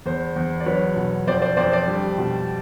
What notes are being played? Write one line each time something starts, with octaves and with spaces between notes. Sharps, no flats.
E2 C5
E2
D5
F#3 B4 C#5
B2
F2 C5 D5
C5 D5
F2 C5 D5
C5 D5
G3
B2